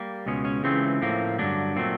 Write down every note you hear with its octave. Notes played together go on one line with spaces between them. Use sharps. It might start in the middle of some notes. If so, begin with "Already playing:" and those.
Already playing: G3 A#3
C#2 B2 G#3 C#4
C#4
C#2 C#3 E3 A3 C4
A2 F3 A#3
G2 D3 F#3 D4
A#2 F#3 A3 C4